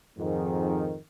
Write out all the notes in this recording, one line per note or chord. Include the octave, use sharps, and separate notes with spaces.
F2 G#2 D#3